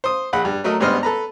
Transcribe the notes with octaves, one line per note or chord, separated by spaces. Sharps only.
C5 D#6
A#1 F#5 B5
G2
F#3 A3 A#4 D#5
G#1 G2 B3 C5 D#5 F6
A4 B4 A#5